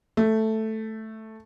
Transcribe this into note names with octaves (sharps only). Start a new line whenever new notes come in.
A3